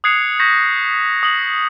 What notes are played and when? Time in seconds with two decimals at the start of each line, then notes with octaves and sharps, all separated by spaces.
0.04 D#6 F#6 G#6 C7 C#7 F7
0.40 C#6 G6 G#6 A#6 B6
1.23 D#6 F#7